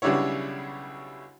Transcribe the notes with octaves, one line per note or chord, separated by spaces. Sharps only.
B1 C#3 G3 D4 E4 C#5